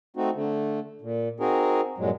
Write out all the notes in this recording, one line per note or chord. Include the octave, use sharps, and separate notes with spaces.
A3 C4 D#4 F#4
D3 A3
A#2
C4 D#4 F#4 G#4 A#4
G2 A#2 F#3 G#3